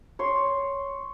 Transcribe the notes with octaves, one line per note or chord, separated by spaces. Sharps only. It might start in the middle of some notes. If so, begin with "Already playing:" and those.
C#5 C6